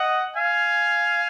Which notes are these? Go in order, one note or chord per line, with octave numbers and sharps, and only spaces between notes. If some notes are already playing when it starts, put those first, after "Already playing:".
Already playing: D#5 F#5
F5 G#5